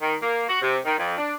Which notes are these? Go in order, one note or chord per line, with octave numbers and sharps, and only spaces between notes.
D#3
A#3
F#4
C3
D#3
F2
D4